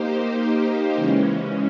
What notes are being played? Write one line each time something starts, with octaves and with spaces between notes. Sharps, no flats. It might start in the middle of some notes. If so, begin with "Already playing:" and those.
Already playing: A#3 D#4 G4 C5
C#3 E3 G#3 C#4